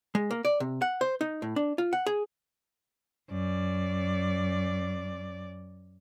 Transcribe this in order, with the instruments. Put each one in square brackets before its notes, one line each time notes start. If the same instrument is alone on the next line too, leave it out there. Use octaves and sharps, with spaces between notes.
[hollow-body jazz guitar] G#3
A#3
D5
C3
F#5
C5
D#4
A2
D4
F4
F#5
G#4
[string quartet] F#2 D5